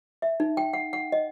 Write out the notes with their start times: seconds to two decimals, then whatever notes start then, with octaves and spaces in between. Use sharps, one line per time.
0.22 E5
0.40 D#4
0.57 G5
0.73 F#5
0.93 F#5
1.12 D#5